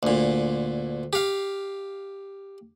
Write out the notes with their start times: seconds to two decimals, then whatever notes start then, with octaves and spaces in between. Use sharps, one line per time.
0.03 D2 A#2
1.13 G4 F5